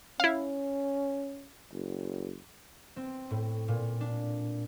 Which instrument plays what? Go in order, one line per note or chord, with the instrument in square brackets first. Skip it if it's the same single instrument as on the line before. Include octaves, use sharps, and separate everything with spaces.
[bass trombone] C#4 [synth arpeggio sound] E4 F5
[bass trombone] F#1
[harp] C4
A2
A#2
D4